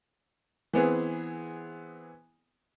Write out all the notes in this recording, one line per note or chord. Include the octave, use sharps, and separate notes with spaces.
E3 B3 C4 G#4